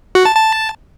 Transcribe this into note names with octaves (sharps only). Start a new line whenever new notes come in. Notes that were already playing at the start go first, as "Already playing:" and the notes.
F#4
A5
A5